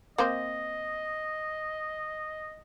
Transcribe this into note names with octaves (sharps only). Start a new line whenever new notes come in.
A#3 C4 C5 D#5